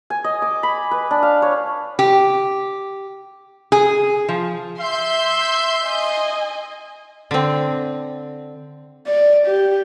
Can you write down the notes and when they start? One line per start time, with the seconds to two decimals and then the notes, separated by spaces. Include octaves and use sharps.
0.10 G#5
0.24 D#5
0.42 D6
0.63 B5
0.91 B4
1.11 D4
1.23 F5
1.42 C#5
1.99 G4
3.72 G#4
4.29 F3
4.80 E5 C6 G6
5.84 D#5 G#5
7.31 D3 C4
9.07 D5
9.47 G4